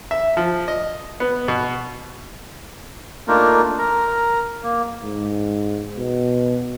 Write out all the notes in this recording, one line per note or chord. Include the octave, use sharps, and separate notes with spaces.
E5
F3
D#5
B3
B2
A3 A#3 D4 D#4 F4 A#4
A#4 A#5
A#3
G#2
B2